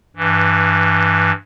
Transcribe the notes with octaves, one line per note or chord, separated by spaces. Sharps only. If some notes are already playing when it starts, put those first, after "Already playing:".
G2 E3